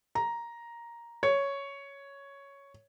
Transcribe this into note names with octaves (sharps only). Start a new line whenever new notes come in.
A#5
C#5